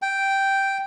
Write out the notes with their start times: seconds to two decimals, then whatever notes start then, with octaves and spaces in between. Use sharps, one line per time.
0.02 G5